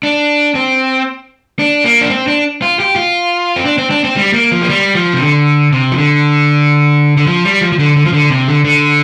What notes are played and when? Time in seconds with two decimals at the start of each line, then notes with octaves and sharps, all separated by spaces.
0.03 D4
0.55 C4
1.59 D4
1.84 A#3
2.01 D4
2.10 C4
2.28 D4
2.62 F4
2.80 G4
2.96 F4
3.56 C4
3.66 D4
3.78 C4
3.91 D4
4.05 C4
4.16 G3
4.34 A#3
4.52 F3
4.62 A#3
4.69 G3
4.95 F3
5.13 C3
5.21 D3
5.73 C3
5.92 F3
5.98 D3
7.17 D3
7.27 F3
7.45 G3
7.61 F3
7.72 F3
7.79 D3
7.96 D3
8.06 F3
8.13 D3
8.30 C3
8.47 D3
8.65 D3